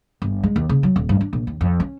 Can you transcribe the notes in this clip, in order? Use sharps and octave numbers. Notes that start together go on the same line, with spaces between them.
G1
G#3
D#2
C#3
F#3
D#1
G2
D4
A#1
D#2
F2
C#4